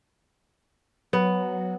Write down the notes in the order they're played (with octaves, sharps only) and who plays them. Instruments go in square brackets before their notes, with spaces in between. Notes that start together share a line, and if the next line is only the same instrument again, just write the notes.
[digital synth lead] F#3 [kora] B3